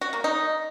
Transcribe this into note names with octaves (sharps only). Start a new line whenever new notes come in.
F#4
A#3
D#4